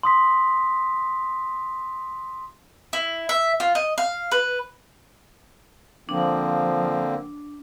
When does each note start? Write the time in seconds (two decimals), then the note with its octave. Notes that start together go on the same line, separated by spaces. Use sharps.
0.03 C6 D#6 B6
2.93 E4
3.29 E5
3.60 F4
3.75 D#5
3.98 F5
4.31 B4
6.09 D3 F3 A#3 C4 D4